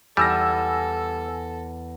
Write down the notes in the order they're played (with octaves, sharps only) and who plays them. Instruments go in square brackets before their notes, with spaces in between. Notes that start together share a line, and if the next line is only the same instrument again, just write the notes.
[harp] E2 [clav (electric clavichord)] G3 [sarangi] A4 [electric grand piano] G#5 E6 A#6